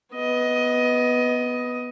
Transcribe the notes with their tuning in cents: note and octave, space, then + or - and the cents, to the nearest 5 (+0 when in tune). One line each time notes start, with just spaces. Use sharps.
B3 +0 D#5 +15